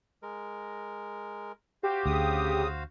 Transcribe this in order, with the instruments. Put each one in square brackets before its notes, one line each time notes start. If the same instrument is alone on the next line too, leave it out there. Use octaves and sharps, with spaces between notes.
[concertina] G#3 A#4
[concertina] F#4 C5 F5 [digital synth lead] G4
[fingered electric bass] D2 [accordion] C#3 D#6